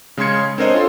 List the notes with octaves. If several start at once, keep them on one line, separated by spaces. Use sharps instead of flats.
C#3 G#3 C#4 C6 G#6 C#7
C4 D4 A#4 C5 C#5 D#5
F4 A4 C6